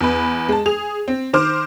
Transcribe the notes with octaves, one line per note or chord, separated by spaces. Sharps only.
E2 B4
G#3 A5
G#4 F7
C4
D#3 C5 D6 F6